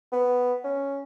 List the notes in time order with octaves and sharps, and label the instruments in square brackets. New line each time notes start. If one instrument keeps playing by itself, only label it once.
[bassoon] B3
C#4